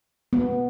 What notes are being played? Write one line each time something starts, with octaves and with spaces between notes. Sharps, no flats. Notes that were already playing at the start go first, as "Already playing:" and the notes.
B3